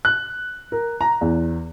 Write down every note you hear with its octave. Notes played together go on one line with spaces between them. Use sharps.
F#6
A#4
A#5
E2